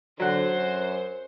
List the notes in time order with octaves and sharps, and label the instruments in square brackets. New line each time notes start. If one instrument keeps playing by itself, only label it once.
[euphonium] D3 [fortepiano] F#3 F#5 [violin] C5
[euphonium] F#2